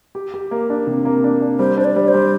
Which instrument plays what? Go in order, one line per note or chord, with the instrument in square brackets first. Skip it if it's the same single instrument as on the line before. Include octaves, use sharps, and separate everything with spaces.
[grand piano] G4
G4
A#3
D4
C3
A#3
D4
D4
[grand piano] G3 [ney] C5
[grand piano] D4 [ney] C5
[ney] D5
[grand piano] G3
[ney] C5
[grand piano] G3